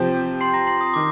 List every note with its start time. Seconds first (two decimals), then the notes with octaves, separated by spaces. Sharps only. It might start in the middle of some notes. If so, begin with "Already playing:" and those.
Already playing: C3 F3 C4 G4 C5
0.41 C6 C7
0.54 A#5 A#6
0.67 C6 C7
0.81 D#6
0.94 D#3 D6